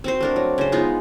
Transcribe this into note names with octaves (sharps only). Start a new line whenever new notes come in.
C4 F#4 C5
A3 D4 A#4
F#3
C#3 C5
G#3 B3 D#4 F4